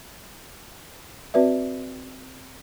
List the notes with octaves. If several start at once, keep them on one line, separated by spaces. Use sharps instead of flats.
C4 F#4 B4 D5 E5